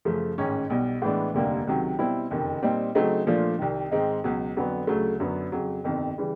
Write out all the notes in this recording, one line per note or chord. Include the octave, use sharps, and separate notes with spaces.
F#2 C#3 F3 A3
A1 G#2 D#3 G#3 C#4
B1 B2 G3
A2 E3 G#3 B3 D4
F1 D#2 D3 G3 A#3
C#2 C3 D#3 F#3
B2 G3 C4 E4
F#1 F2 C3 D#3
A#2 G3 C4 D#4
C#3 F#3 A3 C4 D#4
A#2 F3 A3 D4 F4
C2 C3 D#3
G#2 D#3 G#3 C4 D#4
C#2 B2 F#3
F2 D3 F#3 B3
D2 C#3 F#3 A3
F#2 D3 F#3 B3
F2 C#3 F#3
G1 F2 C3 D#3
C#3 E3 G3